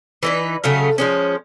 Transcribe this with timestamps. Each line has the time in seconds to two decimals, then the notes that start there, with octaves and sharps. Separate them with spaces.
0.23 E3 D#4 B4
0.64 C#3 F#3 A3 F5
0.98 F3 G#3 C#4